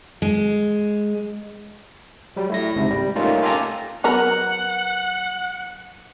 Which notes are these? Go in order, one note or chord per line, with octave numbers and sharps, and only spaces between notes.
G#3
F#3 G3
A3 E4 A#6
G#1 C#2 G#2 C3
G3
A3 A#3 C#4 D#4 F4
F4 G4 A4 G#5 A#5
F#3 B3 A#4 F#5